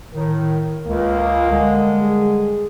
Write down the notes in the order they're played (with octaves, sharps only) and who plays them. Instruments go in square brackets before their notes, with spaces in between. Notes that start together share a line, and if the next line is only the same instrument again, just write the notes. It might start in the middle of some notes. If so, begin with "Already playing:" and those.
[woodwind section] A2 D#3 [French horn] A#4
[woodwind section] C#2 [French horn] A#3
[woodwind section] D3 G3 G#3
[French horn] G#4